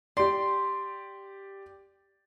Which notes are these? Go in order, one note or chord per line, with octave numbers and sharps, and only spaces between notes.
G4 D5 C6